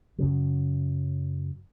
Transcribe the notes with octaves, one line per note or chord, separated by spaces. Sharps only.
F#2 C#3 F#3